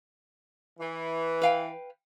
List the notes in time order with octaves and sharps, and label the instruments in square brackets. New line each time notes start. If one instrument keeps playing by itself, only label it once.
[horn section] E3
[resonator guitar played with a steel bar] B4 F5 G5